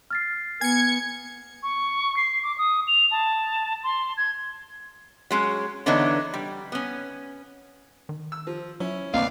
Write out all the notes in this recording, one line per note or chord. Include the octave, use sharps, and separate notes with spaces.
F6 A6 C7
B3 G#5 G#6 C#7
C#6
C7
D6
D#6
F7
A5
C6
G#6
F#3 G#3 C#4
D3 E3 B3 D4 D#4 C#5
G3
B3 C#4
D#3
E6
F3
F#3 C#4 E4
D2 A#3 C4 B4 D5 D#5 F5